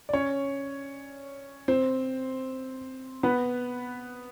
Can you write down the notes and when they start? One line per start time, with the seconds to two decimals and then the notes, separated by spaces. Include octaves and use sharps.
0.09 D5
0.13 C#4 C#5
1.68 C4 C5
3.23 B3 B4